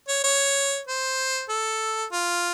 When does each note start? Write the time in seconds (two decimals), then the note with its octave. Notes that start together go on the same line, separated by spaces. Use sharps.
0.08 C#5
0.24 C#5
0.87 C5
1.49 A4
2.12 F4